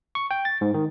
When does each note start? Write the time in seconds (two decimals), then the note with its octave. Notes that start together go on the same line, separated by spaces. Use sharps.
0.15 C#6
0.31 G5
0.45 A6
0.61 G#2
0.74 D#3